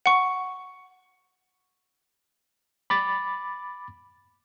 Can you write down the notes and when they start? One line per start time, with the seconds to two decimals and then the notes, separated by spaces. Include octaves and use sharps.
0.06 F#5 C#6
2.90 B5 D6 A6